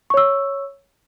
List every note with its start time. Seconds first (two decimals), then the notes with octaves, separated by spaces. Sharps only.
0.10 C#6
0.14 C#5
0.17 E6